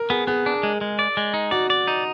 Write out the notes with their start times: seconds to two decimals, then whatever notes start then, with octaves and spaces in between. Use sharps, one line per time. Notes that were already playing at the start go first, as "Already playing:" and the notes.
Already playing: A#4
0.10 B3 G#4
0.27 B3 G#4
0.46 D4
0.63 G#3
0.81 G#3
0.99 D5
1.17 G#3
1.34 D#4
1.51 F#4 D5
1.70 D5
1.88 D#4